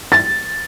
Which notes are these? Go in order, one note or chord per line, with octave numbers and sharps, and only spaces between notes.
A6